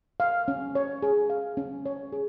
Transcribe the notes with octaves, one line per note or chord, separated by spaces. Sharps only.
F5
C#4
C#5
G#4
F5
C#4
C#5
G#4